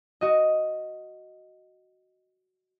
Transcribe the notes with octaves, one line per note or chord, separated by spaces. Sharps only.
F#4 D#5